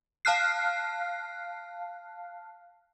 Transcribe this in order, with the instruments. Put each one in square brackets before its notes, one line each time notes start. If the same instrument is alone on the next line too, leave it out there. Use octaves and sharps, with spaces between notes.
[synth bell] F5 A5 F6 F#6 C7